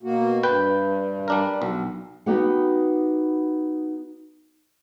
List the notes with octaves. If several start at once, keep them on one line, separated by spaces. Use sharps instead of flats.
B2 A#3 F#4
G2 B4 G5
G3 D4 A#4
B1
B3 D#4 F#4 G4 B4 F#5